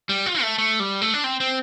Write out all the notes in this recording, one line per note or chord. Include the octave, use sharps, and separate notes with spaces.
G3
F4
A3
A3
G3
A3
D4
C4
C4